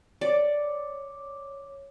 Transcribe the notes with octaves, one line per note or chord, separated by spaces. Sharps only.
C#5 D5 D6